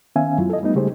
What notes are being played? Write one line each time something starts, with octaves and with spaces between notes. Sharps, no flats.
D#3 B3 C#4 E5 F5 G#5
F#2 F#3 E4 F4
A4 D#5
G3 A3 B3 D#4
C#3 G3 A3 G4 G#4 C5